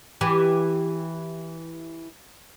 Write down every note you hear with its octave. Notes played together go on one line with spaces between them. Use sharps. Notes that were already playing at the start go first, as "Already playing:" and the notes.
E3 G4